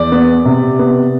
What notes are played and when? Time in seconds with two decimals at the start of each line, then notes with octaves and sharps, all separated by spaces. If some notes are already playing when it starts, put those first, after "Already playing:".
Already playing: E2 D5
0.12 B3
0.45 C3
0.79 B3